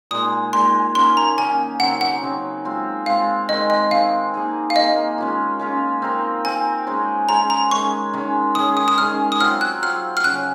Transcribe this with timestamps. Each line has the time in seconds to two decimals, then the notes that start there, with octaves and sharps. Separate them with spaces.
0.11 A#2 G#3 D#4 D#6
0.53 A#2 G#3 D#4 C6
0.95 D#3 A#3 C#4 C6
1.17 A#5
1.38 D#3 A#3 C#4 G#5
1.80 C#3 F#3 C4 D#4 F#5
2.01 F#5
2.22 C#3 F#3 C4 D#4
2.65 G#3 C4 F4
3.06 G#3 C4 F4 F5
3.49 D#3 G#3 C4 D#5
3.70 D#5
3.91 D#3 G#3 C4 F5
4.34 A#3 D#4 G#4
4.70 F5
4.76 A#3 D#4 G#4 D#5
5.18 G#3 C#4 F4
5.59 G#3 C#4 F4
6.02 C4 D#4 A#4
6.45 C4 D#4 A#4 G#5
6.87 G#3 C#4 G#4 C5
7.29 G#3 C#4 G#4 C5 A#5
7.50 A#5
7.71 D#3 G#3 C#4 C#6
8.13 D#3 G#3 C#4
8.55 D#3 G#3 C#4 G#4 D#6
8.77 D#6
8.88 D#6
8.98 D#3 G#3 C#4 G#4 F6
9.32 D#6
9.40 F#3 C4 F4 F6
9.61 F#6
9.82 F#3 C4 F4 F6
10.17 F6
10.24 C#3 F#3 C#4 F#6